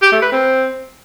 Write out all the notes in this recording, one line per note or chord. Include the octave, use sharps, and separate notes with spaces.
G4
A3
B4
C4